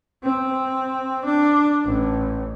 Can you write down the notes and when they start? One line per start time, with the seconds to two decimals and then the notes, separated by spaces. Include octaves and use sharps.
0.23 C4
1.25 D4
1.85 A1